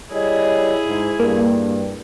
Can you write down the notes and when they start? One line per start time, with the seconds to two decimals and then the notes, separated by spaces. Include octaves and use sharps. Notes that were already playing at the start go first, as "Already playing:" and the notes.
0.11 G3 E4 G#4 C#5 D#5
0.87 G#2
1.20 G2 A#3